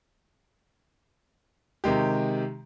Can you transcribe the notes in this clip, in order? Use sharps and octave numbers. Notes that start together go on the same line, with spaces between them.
C3 D#3 G#3 G4